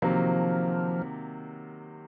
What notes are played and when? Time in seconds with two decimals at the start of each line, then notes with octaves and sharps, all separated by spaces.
0.02 C3 D#3 F3 F#3 A#3